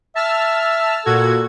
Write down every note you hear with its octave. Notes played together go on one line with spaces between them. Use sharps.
E5 A5 E6 F6
A#2 F#4 A4 G#6